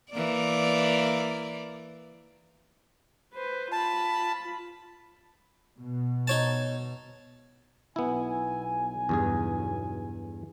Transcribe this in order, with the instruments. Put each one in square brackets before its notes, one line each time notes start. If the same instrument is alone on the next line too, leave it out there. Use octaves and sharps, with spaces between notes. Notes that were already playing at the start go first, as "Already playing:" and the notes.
[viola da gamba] E3 A#3 D5
[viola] B4 C5
[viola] F4 B5 [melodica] A5
[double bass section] B2
[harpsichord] D#4 C#5 A5
[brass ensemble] B1 G#5 [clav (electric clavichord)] B3 E4
[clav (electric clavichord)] E2 G2 G#4